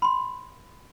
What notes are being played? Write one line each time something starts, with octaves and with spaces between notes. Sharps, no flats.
B5 C6